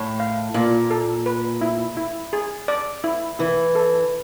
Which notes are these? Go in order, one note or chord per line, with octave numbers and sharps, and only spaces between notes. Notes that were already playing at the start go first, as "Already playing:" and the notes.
Already playing: A2 C#5
F5
A#2 F4
A4
B4
E4
E4
G#4
D5
E4
E3 E4
A4